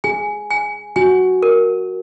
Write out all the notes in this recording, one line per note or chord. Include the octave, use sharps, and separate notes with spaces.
G#4 G#5
G#5
F#4 G#5
A#4